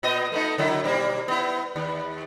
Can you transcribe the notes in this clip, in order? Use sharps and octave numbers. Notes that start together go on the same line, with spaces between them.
A#2 B3 D#5
A3 B3 D#4
D3 F#3 E4
B2 G3 A#3
B3 E4
D#2